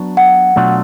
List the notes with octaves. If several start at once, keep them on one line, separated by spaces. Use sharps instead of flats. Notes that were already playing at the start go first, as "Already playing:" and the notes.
Already playing: F#3 B3 D4 F#4
F#5
B2 F#3 A3 D4 F4